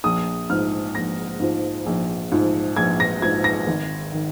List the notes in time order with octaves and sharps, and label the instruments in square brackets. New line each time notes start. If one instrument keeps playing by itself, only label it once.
[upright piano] A#1 D#6
G#2 F3 F6
A#1 A#6
G#2 F3
A#1
G#2 F3
A#1 G#6
A#6
G#2 F3 G#6
A#6
G#1
D#3